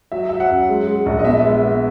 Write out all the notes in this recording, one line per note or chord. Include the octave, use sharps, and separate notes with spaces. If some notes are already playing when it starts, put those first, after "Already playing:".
F#3 E5
F#3 E5
F#5
F#2
G#3
G#3
A#1
D#5
B3 E5
G#3
B3